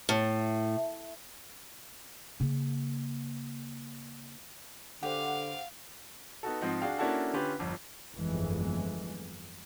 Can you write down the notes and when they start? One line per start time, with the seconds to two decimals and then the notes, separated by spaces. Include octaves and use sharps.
0.09 A2
2.40 C#3 A#3
5.03 D3 G4 B4 C5 F5 F#5 D6
6.43 B3 D#4 F#4 A4
6.61 G#2 F3 C4 D#5 F#5
6.81 D4 F#4 G#4 F5 G5
6.98 A#3 C#4 D4 E4 F#4 A4
7.33 D3 C#4 F4 G4 B4
7.59 G1 F2
8.16 G1 F2 E3 G#3